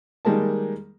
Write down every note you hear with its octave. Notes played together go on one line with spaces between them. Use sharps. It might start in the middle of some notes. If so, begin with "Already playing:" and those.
D#3 G3 G#3 A#3 A5